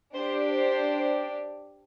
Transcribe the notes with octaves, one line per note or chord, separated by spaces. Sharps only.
D4 G4 C5
C5